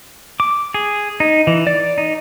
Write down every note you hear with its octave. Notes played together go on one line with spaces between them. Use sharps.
D6
G#4
D#4
E3
D5
D#4